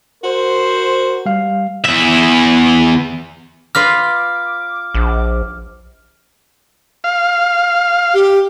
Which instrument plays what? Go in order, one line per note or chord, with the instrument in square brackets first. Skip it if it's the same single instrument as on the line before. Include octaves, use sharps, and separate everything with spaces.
[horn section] F#4 A#4 C5
[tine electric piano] G3 F5
[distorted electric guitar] E2 E5
[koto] F4 B4 A#5 [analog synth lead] D6 [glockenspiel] F6
[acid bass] A#1
[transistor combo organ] F5
[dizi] G4